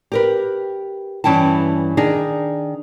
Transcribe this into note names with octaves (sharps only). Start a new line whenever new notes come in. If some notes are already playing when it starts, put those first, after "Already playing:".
G4 A#4 B4
G2 E3 C#4 E4 G5 A5
D#3 D4 D#4 G#4